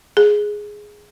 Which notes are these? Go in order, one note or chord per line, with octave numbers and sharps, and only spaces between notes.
G#4